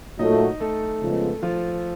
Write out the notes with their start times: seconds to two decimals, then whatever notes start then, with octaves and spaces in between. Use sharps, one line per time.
0.19 A#2 F#3 A3 D#4 D#5
0.60 A3 A4
1.01 C#2 C#3 F3 G#3 B3
1.42 F3 F4